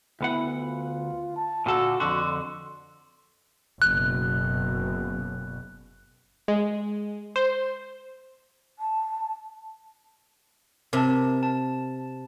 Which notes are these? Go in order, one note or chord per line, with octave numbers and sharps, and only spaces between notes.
D2 B3 E4 F#5
F4
A5
A#2 D3 F#4 A4
F2 D3 F#4 C6
F#1 B2 F#6
G#3
C5
A5
C3 A#4 A5
A5